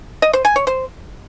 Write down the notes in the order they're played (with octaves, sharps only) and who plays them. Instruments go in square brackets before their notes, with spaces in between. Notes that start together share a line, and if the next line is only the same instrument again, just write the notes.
[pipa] D#5
C5
G#5
C#5
C5